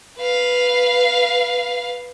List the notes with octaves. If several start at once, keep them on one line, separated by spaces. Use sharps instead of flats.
B4 F5